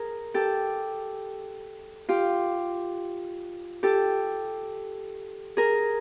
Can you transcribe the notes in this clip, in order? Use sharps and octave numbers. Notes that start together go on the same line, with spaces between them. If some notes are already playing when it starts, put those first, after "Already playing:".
Already playing: G#4 A#4
G4 A4
F4 G4
G4 A4
G#4 A#4